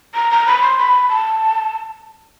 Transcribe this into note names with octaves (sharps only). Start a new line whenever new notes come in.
A#5
A#5
B5
C6
B5
A5